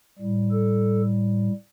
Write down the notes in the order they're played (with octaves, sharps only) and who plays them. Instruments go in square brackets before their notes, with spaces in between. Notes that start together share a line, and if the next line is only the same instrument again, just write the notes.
[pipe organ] A2 G3
A4